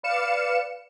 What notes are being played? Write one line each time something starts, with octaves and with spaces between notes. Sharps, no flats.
B4 D5 F5 C#7 E7